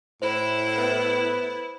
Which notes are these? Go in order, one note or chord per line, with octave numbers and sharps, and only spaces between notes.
A2 E4 C5
B3